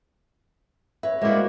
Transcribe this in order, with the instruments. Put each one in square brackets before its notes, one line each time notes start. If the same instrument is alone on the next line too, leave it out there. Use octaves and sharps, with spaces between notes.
[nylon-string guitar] B4 C#5 [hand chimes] E5
[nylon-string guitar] G#3 E4 [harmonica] A#3 F#4 D5 [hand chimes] C5